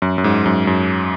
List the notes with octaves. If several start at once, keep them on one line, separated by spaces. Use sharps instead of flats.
F#2
F#2
G#2
F#2
F#2